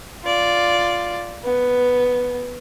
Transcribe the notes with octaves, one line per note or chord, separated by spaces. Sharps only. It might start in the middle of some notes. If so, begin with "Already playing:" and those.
F4 D5
B3